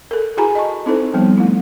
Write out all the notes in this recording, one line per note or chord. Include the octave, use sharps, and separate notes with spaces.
A4 A#4
E4 F#4 G#4 G#5 A#5 B5
D#5 A5 C#6
C4 D#4 E4 A4 C5
F3 G3 B3 C4
A3 E4